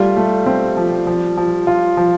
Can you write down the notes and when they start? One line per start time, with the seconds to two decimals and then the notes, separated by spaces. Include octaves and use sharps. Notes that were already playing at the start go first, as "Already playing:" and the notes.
Already playing: G3 A3 F4
0.17 A3
0.46 C4
0.77 F3
1.07 F3
1.37 F3
1.67 F4
1.97 F3